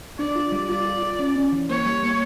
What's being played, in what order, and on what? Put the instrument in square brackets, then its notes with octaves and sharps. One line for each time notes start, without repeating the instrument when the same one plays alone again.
[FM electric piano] D4 [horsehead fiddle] D5
[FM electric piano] F4
G3
[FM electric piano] F4 [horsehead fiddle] D5
[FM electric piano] F4
F4
C#4
C#4
E3
[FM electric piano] A#3 [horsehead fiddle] C#5
[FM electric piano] G3
A#3